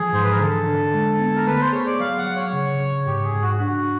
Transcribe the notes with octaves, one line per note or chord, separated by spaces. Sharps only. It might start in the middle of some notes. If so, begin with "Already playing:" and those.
Already playing: E3 F3 G#4
G#2 C5
B4
A#4
D3 A4
D3
G#3
B3
A#4
A3 B4
C5
G#4 C#5
D5
F#3 F5
F#5
F#3
C#5
C#3
C#3
G#2 G4
G#4
G#2
F#4
D4 F#4